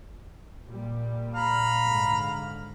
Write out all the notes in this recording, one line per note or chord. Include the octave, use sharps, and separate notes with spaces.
A#2 G3
F5 A#5 B5
G#2 D3